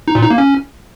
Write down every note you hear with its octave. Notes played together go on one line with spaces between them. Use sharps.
D#4
A#2
D#4
A#3
C#4